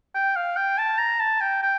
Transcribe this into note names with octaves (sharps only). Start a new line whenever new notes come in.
G5
F5
G5
A5
A#5
A5
G5
G5